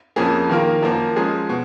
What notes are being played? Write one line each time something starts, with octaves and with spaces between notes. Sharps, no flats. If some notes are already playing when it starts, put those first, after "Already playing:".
F2 F3 A#3 C#4 G#4
D#3 A#3 F4 A#4
F#2 F3 A#3
F3 G#3 C#4 G#4
B2